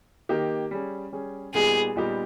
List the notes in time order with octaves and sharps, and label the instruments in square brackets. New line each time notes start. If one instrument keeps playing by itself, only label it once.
[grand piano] D#3 A#3 D#4 G4
G3 C#4 G#4
G3 C#4 G#4
[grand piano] A#2 G3 B3 D#4 G4 [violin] G#4
[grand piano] A#2 G3 B3 D#4 G4